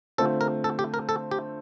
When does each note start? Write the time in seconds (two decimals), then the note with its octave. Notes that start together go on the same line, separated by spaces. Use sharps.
0.18 D3 A3 C4 F4 A4
0.41 A#4
0.64 A4
0.79 G4
0.94 A#4
1.09 A4
1.31 G4